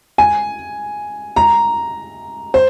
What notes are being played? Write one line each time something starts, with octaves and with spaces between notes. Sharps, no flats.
G#5
A#5
C5